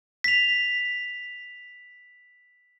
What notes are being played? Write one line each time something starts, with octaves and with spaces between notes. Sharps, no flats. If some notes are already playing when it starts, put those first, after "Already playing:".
B6 F7